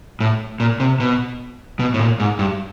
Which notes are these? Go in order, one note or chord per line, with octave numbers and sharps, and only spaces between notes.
A2
A#2
C3
B2
B2
A2
A#2
G#2
G2